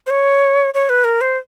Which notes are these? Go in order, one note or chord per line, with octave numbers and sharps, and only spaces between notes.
C5
C#5
C#5
B4
A#4
C5